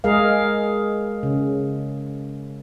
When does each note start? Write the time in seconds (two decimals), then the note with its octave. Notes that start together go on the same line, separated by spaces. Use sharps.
0.04 G#3 G#4 A#4 F5
1.23 C#3